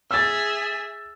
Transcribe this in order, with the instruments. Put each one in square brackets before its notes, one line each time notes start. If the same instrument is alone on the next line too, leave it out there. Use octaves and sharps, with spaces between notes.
[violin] G#4 E5 [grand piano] E6 A6